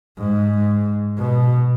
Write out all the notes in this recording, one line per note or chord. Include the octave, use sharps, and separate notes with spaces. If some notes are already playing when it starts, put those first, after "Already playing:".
G#2
B2